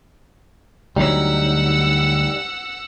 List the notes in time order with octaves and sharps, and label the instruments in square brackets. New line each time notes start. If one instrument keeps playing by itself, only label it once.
[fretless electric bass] D2 F#3 [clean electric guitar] G3 D#4 [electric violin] F#5 E6